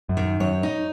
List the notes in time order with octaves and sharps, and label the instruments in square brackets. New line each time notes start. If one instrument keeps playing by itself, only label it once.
[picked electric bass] F#2
[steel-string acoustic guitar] D#3
[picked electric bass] F#2 [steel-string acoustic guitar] C#5
[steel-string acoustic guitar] D#4